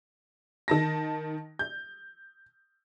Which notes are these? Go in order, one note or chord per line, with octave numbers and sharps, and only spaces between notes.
D#3 A5 A#6
G6